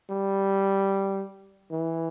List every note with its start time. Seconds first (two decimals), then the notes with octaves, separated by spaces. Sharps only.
0.10 G3
1.72 E3